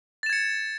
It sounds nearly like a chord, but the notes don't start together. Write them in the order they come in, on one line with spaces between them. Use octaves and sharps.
A6 E7 G#6 C#7